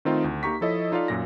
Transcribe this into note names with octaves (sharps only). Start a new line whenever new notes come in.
D#3 A3 C4 D#4 F4
D2
A#3 D#4 G4 A#5 C#6 B6
F3 E4 A4 C#5 D#5
D#4 F4 A4 D5 F5
F#2 A#2 A#6